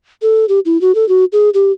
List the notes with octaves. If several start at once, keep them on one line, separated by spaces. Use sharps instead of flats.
A4
G4
E4
F#4
A4
F#4
G#4
G4